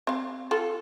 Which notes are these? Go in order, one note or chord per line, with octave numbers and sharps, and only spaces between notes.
C4 F5
F4 A4